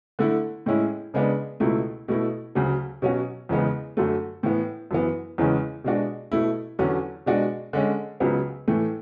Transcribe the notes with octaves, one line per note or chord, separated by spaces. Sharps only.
D3 A3 E4
A2 G#3 C#4 E4
C#3 G#3 B3 D4
C#2 B2 A3 E4
B2 A3 E4
D2 C#3 F#3
B2 F#3 C#4 F#4
E2 C#3 E3 G#3 B3
F#2 D3 F#3 A3
A2 E3 B3
F#2 E3 B3
E2 C#3 E3 G#3 C#4
B2 G#3 D4 F#4
B2 A3 E4
E2 D3 F#3 C#4
B2 G#3 D4 F#4
D3 G#3 C#4
C#2 C#3 F#3 B3
A2 E3 A3